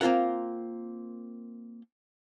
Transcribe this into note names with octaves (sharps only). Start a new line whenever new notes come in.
A#3 C4 F4 A#4 F#5